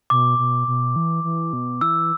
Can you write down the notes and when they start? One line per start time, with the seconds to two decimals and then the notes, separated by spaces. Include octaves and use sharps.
0.10 B2 D6
0.39 B2
0.68 B2
0.96 E3
1.24 E3
1.53 B2
1.81 E3 E6